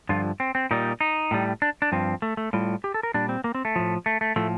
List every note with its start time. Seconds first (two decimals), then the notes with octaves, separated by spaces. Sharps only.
0.09 G2 D3 F3 F4
0.40 C4
0.55 C4
0.71 A#2 G3 D#4
1.01 D#4
1.31 A2 G3
1.62 D4
1.82 D4
1.92 G2 F3 C4
2.22 A3
2.37 A3
2.53 A2 G3 F4
2.84 G4
2.94 A4
3.03 A#4
3.14 A#2 G3 D4
3.29 C4
3.44 A#3
3.55 C4
3.65 A3
3.76 A2 F3
4.06 A3
4.21 A3
4.36 A2 F3 A3